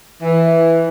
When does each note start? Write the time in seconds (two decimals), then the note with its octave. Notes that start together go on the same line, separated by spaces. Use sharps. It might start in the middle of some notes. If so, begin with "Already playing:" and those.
0.22 E3